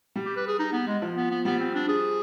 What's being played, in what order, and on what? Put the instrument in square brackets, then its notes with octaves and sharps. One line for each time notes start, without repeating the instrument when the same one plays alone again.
[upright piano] G3
[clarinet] G4
B4
G#4
D#4
B3
G#3
[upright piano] F3
[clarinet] B3
B3
[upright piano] G3 [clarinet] B3
[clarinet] C4
D4
G#4